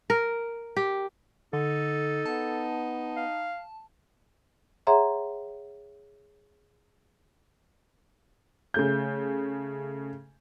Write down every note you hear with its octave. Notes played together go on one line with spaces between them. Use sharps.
A#4
G4
D3 D#4 A4
B3 A5
F5
G#4 C#5 E5 F#5 A#5 C6
C#3 A3 G6